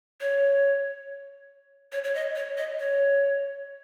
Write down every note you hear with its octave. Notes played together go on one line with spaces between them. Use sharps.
C#5
C#5
C#5
D#5
C#5
D#5
C#5